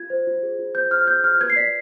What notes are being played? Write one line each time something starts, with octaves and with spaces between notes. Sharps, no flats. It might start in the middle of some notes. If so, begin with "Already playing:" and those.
Already playing: F4 G#6
C5
F4
G#4
F4
C5 G6
F4 F6
G#4 G6
F4 F6
B4 G#6
C7
D5 B6